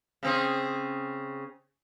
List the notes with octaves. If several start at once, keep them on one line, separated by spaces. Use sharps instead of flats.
C#3 C4 G#4